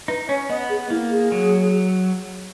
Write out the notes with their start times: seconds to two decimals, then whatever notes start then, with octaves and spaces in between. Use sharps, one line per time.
0.08 D#4 B4
0.29 C#4 C#5
0.50 B3 D#5
0.69 G#4
0.90 A#3 E4
1.11 G#4
1.32 F#3